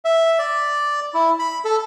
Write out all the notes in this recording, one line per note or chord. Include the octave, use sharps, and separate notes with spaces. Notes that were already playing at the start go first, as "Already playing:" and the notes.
E5
D5
E4
B5
A4